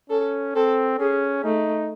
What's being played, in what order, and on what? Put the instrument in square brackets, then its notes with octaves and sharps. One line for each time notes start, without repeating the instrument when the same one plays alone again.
[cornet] C#4 [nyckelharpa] A4
[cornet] C4 [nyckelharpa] A4
[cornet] C#4 [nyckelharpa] G#4
[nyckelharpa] A3 [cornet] D#4